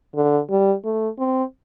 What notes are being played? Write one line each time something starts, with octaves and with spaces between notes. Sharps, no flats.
D3
G3
A3
C4